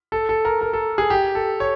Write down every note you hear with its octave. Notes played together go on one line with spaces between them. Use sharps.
A4
A4
A#4
A#4
A4
G#4
G4
A4
C#5